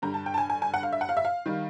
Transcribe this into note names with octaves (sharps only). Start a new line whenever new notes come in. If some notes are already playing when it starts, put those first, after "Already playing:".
G2 D3 G3 A#5
A5
G5
A5
G#5
G#5
G#5
F#5
F5
E5
F#5
F5
E5
F5
D#3 G3